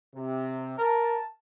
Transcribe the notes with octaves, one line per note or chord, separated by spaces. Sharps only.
C3
A#4 A5